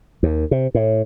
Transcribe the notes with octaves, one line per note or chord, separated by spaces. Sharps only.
D#2
C3
A2